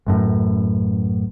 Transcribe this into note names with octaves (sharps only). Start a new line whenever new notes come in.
A1 F#2 A2